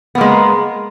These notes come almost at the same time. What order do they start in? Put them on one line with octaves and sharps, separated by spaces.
B3 A#3 G#3 A#4